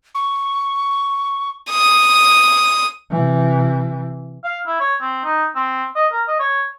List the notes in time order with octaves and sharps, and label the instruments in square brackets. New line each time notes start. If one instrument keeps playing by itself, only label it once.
[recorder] C#6
[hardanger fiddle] D#6
[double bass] C3 E3
[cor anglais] F5
E4
C#5
C4
D#4
C4
D#5
A#4
D#5
C#5